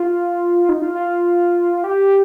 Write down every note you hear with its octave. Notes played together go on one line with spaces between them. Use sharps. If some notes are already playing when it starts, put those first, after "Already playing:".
Already playing: F4
D#4
F4
F4
G4